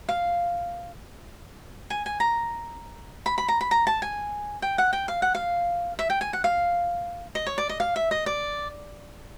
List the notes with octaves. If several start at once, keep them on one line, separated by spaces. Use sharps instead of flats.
F5
G#5
G#5
A#5
B5
B5
A#5
B5
A#5
A5
G#5
G5
F#5
G5
F5
F#5
F5
E5
G5
G#5
F#5
F5
D#5
C#5
D5
D#5
F5
E5
D#5
D5